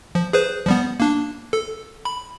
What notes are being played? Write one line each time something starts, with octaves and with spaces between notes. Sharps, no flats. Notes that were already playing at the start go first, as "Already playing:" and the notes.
F3
G#4 B4 C5
F3 G3 B3
A#3 D4
A4
B5